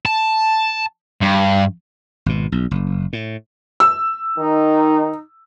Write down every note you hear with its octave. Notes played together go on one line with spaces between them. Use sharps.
A5
G2
G#1 B2
B1
F#1
A2
E6
D#3 D#4